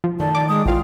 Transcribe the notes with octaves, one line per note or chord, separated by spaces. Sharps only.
F3
D#3 A3 D5 A5
D5 D6
G#3 D#6
A1 A2 F4 F5 G5